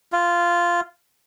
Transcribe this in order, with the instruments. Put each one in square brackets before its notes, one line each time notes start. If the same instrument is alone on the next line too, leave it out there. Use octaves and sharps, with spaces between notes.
[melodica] F4